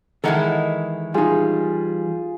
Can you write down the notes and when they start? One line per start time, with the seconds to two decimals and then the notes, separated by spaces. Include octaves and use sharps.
0.24 D#3 E3 G#3 E4 A4 A#4 F#5
1.14 G3 D#4 F4 G#4